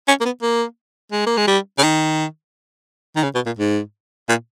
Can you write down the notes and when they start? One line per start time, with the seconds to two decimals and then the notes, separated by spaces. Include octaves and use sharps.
0.08 C#4
0.21 A#3
0.25 B3
0.42 A#3
1.12 G#3
1.26 A#3
1.37 G#3
1.47 G3
1.78 C#3
1.83 D#3
3.16 D#3
3.23 C#3
3.35 B2
3.46 A#2
3.58 G#2
4.29 A#2